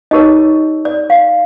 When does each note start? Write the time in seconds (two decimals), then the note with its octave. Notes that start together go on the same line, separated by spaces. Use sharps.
0.11 D#4 G4 A#4 C#5 D#5
0.85 D5
1.10 F5